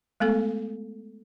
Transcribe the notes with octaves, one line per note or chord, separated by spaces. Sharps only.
G#3 A3 B3 A4